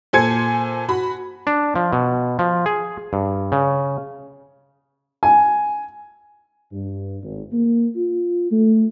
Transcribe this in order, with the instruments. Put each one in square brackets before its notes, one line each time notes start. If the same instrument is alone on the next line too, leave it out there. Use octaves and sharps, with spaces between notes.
[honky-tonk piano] A#2 A4 C5 G#5 G#6 C#7
F#4 B5
[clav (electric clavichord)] D4
F3
B2
F3
G#4
G2
C#3
[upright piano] G#5
[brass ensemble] G2
G#1
A#3
F4
A3